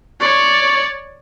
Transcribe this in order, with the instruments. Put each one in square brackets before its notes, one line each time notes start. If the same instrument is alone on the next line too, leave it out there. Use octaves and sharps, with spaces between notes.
[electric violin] C#5 D5 [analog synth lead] C#6